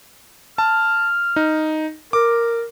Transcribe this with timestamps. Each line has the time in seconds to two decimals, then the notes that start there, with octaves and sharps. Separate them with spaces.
0.58 A5 F6
1.36 D#4
2.13 A#4 D6